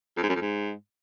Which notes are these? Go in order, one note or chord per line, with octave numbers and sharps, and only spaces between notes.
F2
G#2
F#2
F2
G#2